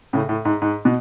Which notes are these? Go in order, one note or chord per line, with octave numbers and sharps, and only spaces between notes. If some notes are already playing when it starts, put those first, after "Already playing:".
A2 C#3
A2
G#2
G#2
B2